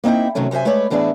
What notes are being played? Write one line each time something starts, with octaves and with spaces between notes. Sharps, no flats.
A#3 C4 D#4 E4 G5
F#2 C3 D#3 F#3 A3 C#4
F#2 C3 C5 E5 G#5
G#3 A3 B4 C#5 D5
A2 E3 B3 D4 G#4 E5